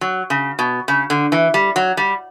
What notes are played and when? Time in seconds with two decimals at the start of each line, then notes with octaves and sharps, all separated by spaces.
0.01 F#3
0.30 C#3
0.59 B2
0.88 C#3
1.10 D3
1.32 E3
1.54 G3
1.76 F#3
1.97 G3